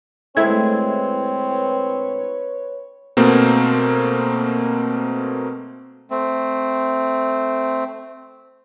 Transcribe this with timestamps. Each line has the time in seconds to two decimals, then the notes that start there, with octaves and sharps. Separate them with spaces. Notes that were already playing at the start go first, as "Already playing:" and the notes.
0.37 D2 G#3 A3 C4 E4 B4 C#5 G#6
3.17 B2 A3 A#3 C4
6.10 A3 C4